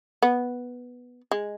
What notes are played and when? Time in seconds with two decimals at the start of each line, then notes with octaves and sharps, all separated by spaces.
0.22 B3
1.31 G#3